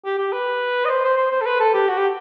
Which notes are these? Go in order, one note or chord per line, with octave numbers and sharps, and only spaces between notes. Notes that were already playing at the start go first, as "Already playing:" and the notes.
G4
G4
B4
D#5
C5
C5
C5
C5
A4
B4
A4
G4
F#4
G4